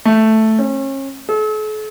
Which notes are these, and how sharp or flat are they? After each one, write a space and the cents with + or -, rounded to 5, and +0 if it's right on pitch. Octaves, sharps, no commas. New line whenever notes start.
A3 +0
C#4 -35
A4 -45